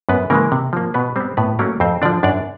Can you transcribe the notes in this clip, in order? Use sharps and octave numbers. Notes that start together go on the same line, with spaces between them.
F#2 B3 B4
C#3 E3 G#3 A#3 A#4
C3
F3 A#3
B2 B3 B4
G3 B3 C4 C5
A2 B3 B4
F#3 A3 A#3 C#4 A#4
F2 C4 C5
D3 F3 D4 D5
F#2 D4 D5